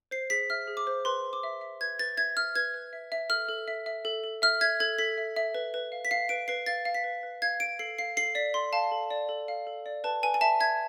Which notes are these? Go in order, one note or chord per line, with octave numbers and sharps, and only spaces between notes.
C5 C7
G#4 B6
E5 F6
G#4
D6
C5
B4 C6
B4
D6
E5
E5
B4 G#6
B4 A6
E5 G#6
E5 F6
B4 G#6
B4
E5
E5
A4 F6
A4
E5
E5
A4
A4
E5 F6
E5 G#6
A4 G#6
A4 B6
E5
E5
B4
B4
F5
B6
F5 C7
B4 D7
B4 C7
F5 A6
F5
B6
B4
B4
F5 G#6
F5 D7
A4 C7
F5 C7
A4 C7
D5 B6
A4 C6
F5 A5
A4
D5
A4
F5
A4
D5
B4 A5
B4 G#5
G#5
E5 A5
E5 G#6